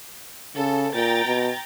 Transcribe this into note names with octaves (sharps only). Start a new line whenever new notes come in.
C#3 A4
A#2 G5 A#5 A6
B2